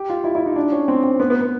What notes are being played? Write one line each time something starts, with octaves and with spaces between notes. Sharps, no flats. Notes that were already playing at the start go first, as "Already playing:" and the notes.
Already playing: G4
F4
E4
E4
D#4
D4
C#4
C4
C4
B3
B3
B3